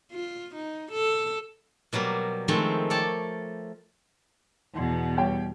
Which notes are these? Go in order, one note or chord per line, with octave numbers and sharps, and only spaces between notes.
F4
D#4
A4
B2 F#3 G3 A#3
D#3 F3 G#3 A3 C4
A4 C#5 D5 G5 A5
E2 B2
G3 C#5 G5